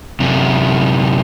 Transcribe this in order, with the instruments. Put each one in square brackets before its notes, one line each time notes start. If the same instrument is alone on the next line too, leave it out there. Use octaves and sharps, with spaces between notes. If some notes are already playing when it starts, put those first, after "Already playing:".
[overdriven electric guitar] F#2 C3